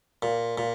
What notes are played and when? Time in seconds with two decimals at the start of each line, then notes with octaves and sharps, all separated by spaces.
0.22 A#2
0.58 A#2